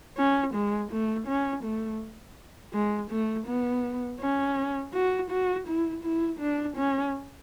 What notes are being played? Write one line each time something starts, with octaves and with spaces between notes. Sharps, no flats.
C#4
G#3
A3
C#4
A3
G#3
A3
B3
C#4
F#4
F#4
E4
E4
D4
C#4